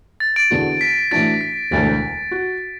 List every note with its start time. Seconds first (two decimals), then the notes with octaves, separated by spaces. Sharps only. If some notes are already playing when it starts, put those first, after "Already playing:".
0.20 A6
0.36 A6 D7
0.51 E2 D3 B3 F#4
0.81 B6
1.11 A2 E3 D4 F#4 A6 D7
1.41 B6
1.71 E1 D2 D3 A6
2.31 F#4